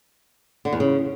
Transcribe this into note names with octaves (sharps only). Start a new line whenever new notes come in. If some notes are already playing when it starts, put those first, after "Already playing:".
D3
E2
C#3